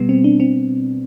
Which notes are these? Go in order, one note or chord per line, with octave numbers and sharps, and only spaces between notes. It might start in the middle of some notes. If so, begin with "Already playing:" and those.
Already playing: B2 G3 B3
C4
D4
C4